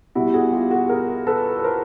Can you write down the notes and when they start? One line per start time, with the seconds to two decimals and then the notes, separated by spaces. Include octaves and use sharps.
0.15 B2 G3 E4 F#4
0.34 F#4 G#4
0.52 F4 G4
0.71 F#4 G#4
0.89 G#4 A#4
1.27 A4 B4
1.59 B4
1.64 A#4 C5